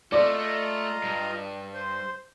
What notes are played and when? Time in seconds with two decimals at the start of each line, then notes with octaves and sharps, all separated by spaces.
0.12 A3 F4 D5 D#5 A#5
1.04 G2
1.74 C5